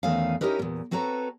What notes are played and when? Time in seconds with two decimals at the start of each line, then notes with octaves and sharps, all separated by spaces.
0.03 E2 D#3 A3 C#4 G#4 F5
0.41 C#4 D#4 E4 G4 A#4 B4
0.59 E2 A#2
0.91 C4 F#4 A4 B4 C#5 A#5